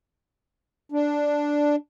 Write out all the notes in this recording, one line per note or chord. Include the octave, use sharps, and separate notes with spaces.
D4